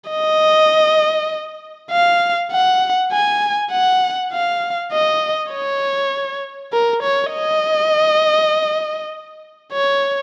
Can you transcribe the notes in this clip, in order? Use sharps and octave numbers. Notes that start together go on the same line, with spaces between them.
D#5
F5
F#5
G#5
F#5
F5
D#5
C#5
A#4
C#5
D#5
C#5